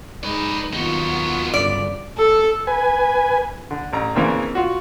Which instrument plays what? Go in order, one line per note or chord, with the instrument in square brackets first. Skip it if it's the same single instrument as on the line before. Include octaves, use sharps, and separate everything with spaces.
[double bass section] G#3 [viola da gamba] D#4 [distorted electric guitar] B4 D5
[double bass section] D#2 [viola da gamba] F#3 B3 F4 [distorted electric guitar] D#4 F#4
[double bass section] G1 C#3 [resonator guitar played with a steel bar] D5
[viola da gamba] A4
[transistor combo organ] B4 G#5
[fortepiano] D3
A1 A#5
C#3 E3 A#3 C4 D4
F4 F#4